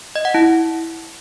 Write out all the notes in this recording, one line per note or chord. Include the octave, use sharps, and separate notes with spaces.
D#5
F#5
E4